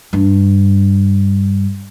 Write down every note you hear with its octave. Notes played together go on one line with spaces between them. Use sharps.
G2 D4